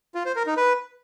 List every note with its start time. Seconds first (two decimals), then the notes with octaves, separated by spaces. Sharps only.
0.15 F4
0.25 C5
0.36 A#4
0.47 D#4
0.57 B4